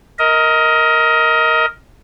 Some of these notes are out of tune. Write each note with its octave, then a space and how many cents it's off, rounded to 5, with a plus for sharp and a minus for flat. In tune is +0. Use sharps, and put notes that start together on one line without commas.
A#4 +0 D#5 +25